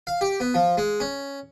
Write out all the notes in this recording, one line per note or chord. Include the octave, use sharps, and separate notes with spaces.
F5
G4
B3
F3
G#3
C#4